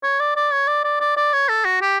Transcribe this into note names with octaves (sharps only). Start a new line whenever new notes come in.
C#5
D5
D5
C#5
D5
D5
D5
D5
C#5
A4
F#4
G4